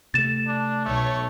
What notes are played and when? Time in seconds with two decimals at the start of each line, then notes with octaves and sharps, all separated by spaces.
0.14 C3 A3 A6 E7
0.47 D4
0.86 B1 A3 C#5